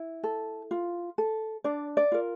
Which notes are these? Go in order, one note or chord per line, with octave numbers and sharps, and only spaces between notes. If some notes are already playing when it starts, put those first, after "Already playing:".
Already playing: E4
A4
F4
A4
D4 D5
D5
F4 A#4